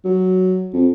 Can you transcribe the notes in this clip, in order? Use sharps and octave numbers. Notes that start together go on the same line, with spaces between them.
F#3
F2